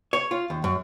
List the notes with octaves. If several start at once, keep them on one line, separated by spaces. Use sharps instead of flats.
C#5
F4
D#2
F#2